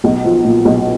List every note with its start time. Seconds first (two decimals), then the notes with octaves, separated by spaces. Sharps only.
0.04 B1
0.25 F3
0.45 A#2
0.65 B1